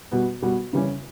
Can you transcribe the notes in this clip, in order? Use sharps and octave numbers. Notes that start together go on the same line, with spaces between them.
B2 G3 B3 F#4
B2 G3 B3 F#4
C#3 E3 G3 C#4